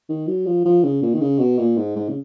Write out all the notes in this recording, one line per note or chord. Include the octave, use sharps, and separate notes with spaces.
D#3
F#3
F3
F3
C#3
A#2
D#3
C#3
B2
A#2
G#2
G#2
C#3